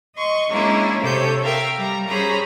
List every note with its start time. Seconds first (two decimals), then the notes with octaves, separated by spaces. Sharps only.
0.15 D#5 C6 C#6
0.48 G#3 A#3 C#4 D4 E4
1.01 C3 C4 A4 C#5 G6
1.41 A#4 E5 F5 G5
1.76 G3 A#5
2.07 G3 C#4 G#4 C5 A#5 B5